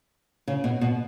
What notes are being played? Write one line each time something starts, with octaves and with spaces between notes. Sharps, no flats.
C#3
B2
B2